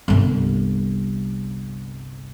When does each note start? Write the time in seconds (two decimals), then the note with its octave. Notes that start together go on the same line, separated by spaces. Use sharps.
0.08 G1 C2